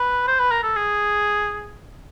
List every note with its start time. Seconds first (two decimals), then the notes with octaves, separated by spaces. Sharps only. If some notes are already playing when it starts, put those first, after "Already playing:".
Already playing: B4
0.28 C5
0.40 B4
0.52 A#4
0.63 A4
0.76 G#4